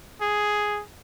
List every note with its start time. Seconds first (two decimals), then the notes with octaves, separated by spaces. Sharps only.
0.21 G#4